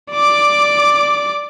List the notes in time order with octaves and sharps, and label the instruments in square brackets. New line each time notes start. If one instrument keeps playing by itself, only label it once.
[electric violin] D5 D6